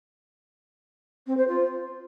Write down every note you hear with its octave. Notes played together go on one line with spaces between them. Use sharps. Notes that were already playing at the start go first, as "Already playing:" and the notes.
C4
C5
F4